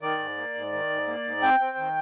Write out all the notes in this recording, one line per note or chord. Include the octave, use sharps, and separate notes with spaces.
D#3 D5
G#2
A#3
G#2
D#3
G#2
A#3
G#2
C4 G5
C4
D#3